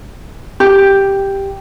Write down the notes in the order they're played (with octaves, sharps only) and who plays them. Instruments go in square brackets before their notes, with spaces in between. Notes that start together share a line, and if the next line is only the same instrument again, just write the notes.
[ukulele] G4